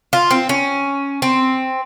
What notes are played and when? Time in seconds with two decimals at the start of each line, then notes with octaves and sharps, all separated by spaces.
0.13 F4
0.31 C4
0.49 C#4
1.22 C4